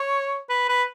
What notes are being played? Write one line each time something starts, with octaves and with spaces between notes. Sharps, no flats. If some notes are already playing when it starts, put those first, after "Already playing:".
Already playing: C#5
B4
B4